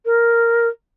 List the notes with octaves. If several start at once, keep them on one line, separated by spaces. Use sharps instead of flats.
A#4